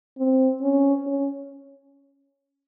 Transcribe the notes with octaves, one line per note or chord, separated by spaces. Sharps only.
C4
C#4
C#4